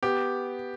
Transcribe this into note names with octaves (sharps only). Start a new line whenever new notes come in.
B3 G4